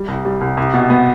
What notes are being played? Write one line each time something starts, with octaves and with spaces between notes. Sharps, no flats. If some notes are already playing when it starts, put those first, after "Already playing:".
Already playing: G3
C2
G3
C2
C2
B2
B3